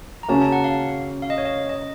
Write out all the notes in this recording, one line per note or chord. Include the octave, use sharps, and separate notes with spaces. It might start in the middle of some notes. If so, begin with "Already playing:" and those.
A#5
C#3 F#3 A#3 C#4 A5
A5
F#5
F5
F5
D#5
C#5
D#5
D#5